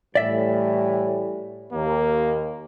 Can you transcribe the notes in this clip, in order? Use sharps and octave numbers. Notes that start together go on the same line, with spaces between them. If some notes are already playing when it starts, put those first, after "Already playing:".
A2 E3 G3 D5 E5
D#2 A#3